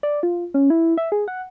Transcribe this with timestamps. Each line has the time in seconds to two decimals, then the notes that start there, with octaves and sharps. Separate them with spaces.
0.03 D5
0.23 F4
0.54 C#4
0.70 E4
0.98 E5
1.12 G#4
1.28 F#5